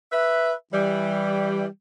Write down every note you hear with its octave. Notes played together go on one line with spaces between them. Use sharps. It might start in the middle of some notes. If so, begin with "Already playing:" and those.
B4 E5
E3 G3